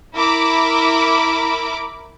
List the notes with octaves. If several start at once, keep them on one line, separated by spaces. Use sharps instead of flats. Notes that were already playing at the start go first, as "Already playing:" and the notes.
E4 A#4 B5 D6